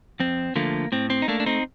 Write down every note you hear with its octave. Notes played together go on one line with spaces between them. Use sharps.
F2 C4
D3 F3 A3 A#3
A2 C4
C4
D#4
A3 A#3 D4
D4
C4 D#4